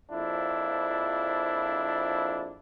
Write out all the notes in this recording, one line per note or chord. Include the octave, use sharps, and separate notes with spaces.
A#1 F2 D4 E4